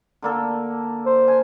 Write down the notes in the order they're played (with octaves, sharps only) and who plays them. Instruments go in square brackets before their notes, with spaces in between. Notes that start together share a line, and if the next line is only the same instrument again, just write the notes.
[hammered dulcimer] D3 A#3 A4
[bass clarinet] C5
[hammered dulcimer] G#5